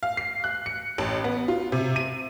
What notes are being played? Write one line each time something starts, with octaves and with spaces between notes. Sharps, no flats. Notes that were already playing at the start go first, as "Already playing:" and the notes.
F5
C7
F#6
C#7
A1
B3
F4
C3
D#7